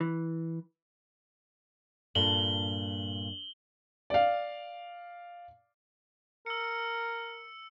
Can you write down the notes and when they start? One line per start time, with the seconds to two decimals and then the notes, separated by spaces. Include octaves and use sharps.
0.01 E3
2.15 G2 A#2 A4 F#7 G7
4.10 D5 F5
6.46 A#4 E6 C#7